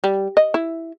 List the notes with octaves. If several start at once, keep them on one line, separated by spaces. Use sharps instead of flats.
G3
D#5
E4